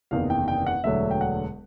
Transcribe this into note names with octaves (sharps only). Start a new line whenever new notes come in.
F#1 E2 C3 D#3 F5
G5
G5
F#5
E1 D2 D3 F#3 E5
G5
F#5